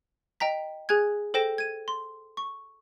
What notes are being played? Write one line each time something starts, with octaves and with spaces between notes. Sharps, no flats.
D#5 G5 A#5 B6
G#4 G#5 F#6 G#6
A4 C5 G5 A#6 E7
G#6 D#7
C6
C#6